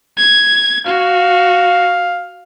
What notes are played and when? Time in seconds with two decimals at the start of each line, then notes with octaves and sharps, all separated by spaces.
0.18 G#6
0.86 F#4 F5